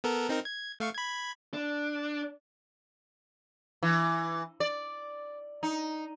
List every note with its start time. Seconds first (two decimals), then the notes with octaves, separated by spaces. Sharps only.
0.04 B3 A4 A#4
0.29 C4 D#4 A#4
0.45 G#6
0.80 A3 F5 C#6
0.94 B5 G#6
1.54 D4
3.83 E3
4.60 D5
5.63 D#4